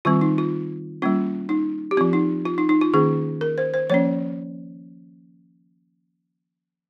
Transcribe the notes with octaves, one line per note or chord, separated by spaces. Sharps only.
D#3 G3 C4 F4
D#4
F4
G3 A#3 C#4 F4
D#4
G4
F3 C4 F4
D#4
F4
D#4
D#4
F4
D#3 A#3 C#4 G#4
A#4
C5
C5
F3 A#3 C#4 C#5